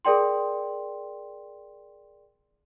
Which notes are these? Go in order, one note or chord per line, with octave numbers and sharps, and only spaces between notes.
G#4 A#4 D5 G5 C6